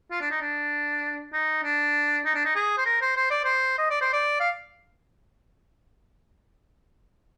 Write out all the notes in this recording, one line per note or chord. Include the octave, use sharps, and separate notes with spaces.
F4
D4
D#4
D4
D#4
D4
D#4
D4
D#4
G#4
C5
A#4
C5
C5
D5
C5
D#5
D5
C5
D5
F5